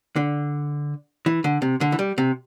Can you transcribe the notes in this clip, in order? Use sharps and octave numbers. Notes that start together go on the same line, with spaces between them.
D3
E3
D3
C3
D3
E3
G3
C3